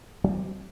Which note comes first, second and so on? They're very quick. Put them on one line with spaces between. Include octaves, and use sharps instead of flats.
F#3 G3 B3 C4